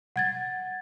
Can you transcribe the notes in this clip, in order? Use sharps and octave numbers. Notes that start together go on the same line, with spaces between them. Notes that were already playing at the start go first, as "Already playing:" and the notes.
F#5 G#6 A6